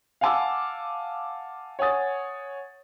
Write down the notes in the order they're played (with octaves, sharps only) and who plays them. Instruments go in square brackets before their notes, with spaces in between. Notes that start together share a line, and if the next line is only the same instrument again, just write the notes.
[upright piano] F5 F#5 G#5 A5 D6 E6
C#5 F#5 G#5 D#6 A6